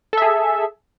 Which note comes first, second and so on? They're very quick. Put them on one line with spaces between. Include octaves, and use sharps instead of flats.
A4 E5 G#4